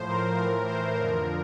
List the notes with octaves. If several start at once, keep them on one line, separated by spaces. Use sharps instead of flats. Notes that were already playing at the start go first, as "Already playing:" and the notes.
Already playing: A2 F3 C5
A#4
A2 E3 A#4
C5
F2 D3 F3 A#4